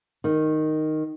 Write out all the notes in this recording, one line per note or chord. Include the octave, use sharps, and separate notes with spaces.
D#3